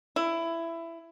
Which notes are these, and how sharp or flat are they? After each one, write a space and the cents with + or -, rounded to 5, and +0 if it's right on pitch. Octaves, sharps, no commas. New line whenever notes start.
E4 +15